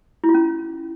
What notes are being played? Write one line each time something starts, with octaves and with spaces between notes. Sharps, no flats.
E4
F4
C#4